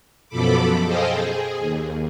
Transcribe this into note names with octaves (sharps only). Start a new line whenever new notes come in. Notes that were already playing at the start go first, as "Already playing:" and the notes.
F#2 B2 F3 A4 B5 D6
G#4 A4 C5 D#5 F5 G5
G#4
D#2